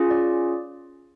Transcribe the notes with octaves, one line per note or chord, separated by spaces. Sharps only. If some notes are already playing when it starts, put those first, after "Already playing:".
Already playing: C#4 F4 G#4
D5